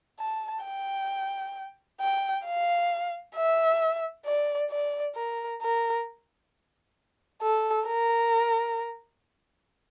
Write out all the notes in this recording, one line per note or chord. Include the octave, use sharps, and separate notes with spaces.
A5
G5
G5
F5
E5
D5
D5
A#4
A#4
A4
A#4